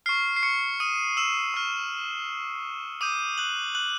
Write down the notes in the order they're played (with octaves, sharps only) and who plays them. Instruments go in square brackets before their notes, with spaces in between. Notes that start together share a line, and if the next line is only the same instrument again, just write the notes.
[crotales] C#6 F6 C7
C7
C#6 C#7
D#6 D#7
E6 E7
C#6 F6
D6 D#6 G6 D#7
F#6 F#7
F#6 F#7